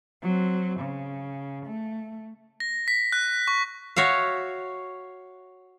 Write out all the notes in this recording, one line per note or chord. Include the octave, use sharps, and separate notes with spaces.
F#3 C4
C#3
A3
A#6
B6
F#6
C#6
F#4 C#5 E5 F5